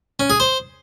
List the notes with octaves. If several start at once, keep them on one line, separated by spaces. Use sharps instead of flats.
C#4
G#4
C5